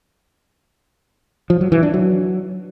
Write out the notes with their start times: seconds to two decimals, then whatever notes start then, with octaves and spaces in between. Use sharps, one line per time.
1.50 F3
1.61 F#3
1.72 E3
1.83 D4
1.94 F#3